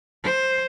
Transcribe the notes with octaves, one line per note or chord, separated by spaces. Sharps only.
C5